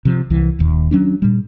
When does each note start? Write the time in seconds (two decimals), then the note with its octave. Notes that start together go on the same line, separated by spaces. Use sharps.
0.05 C3 F3
0.30 C2 E3
0.59 D#1 D#2
0.91 F#3 C#4 D4
1.22 A#2 G3